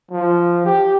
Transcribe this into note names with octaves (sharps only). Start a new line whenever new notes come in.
F3
G4